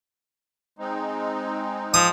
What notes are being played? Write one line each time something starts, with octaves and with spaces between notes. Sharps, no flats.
G#3 C4 D#4
F3 D#6